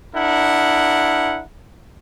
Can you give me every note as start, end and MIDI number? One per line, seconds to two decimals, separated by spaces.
0.15 1.42 62
0.15 1.42 64
0.15 1.42 70
0.15 1.42 78